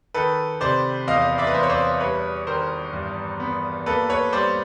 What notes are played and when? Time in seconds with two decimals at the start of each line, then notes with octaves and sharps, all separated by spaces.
0.14 D#3 A4 B4
0.61 C3 C5 D5
1.07 E2 D#5 F5
1.38 D5 E5
1.47 B4
1.54 E2 C5
1.63 C#5
1.69 C5 D5
2.00 G3 B4 C#5
2.47 D#3 A#4 C5
2.93 G2
3.40 B3
3.86 A#3 A4 B4
4.10 B4 C#5
4.33 G3 C5 D5